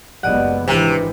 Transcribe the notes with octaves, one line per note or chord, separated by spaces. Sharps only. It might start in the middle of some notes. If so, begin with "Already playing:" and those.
F#1 C#2 B3 G4 D5 D#5 F#5
G#1 C3 D#3 E3 D4 E4 B4